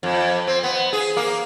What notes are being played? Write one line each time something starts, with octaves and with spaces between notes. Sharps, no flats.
F2
C4
B3
G#4
A#3